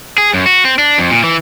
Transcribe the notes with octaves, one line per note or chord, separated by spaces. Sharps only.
G#4
F#2
F#4
C4
D4
F2
A#2
E3